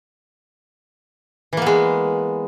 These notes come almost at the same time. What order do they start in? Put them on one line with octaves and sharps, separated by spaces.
E3 A#3 B3 G#3